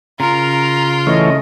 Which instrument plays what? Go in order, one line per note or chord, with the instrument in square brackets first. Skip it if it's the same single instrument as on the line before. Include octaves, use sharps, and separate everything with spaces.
[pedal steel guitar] C#3 A#4 [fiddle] F4 [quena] A#5
[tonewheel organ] E3 A3 C#4 [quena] D#5